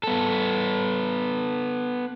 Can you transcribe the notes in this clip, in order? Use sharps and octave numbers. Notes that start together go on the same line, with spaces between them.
B3 A4